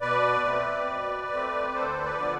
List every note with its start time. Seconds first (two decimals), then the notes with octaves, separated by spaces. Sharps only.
0.01 B2 B4 D5
0.45 A3 C4
0.88 B2
1.32 A3 C4
1.74 D2 A4 C5
2.04 B4 D5
2.18 D3 F3 B3